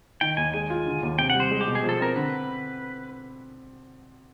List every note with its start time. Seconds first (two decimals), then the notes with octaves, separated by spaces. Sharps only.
0.21 D#3 G5
0.37 D#2 G#5
0.54 G#3 G#5
0.70 F4
0.86 D3
1.03 D#2
1.18 C3 G5
1.30 F#5
1.35 G3
1.40 C5
1.51 G#3
1.61 G4
1.67 B2
1.75 G#4
1.83 F3
1.89 A4
2.00 C4 A#4
2.16 D3 B4